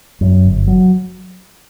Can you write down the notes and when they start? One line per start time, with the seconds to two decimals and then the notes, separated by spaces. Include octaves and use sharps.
0.21 F#2
0.44 G1
0.67 F#3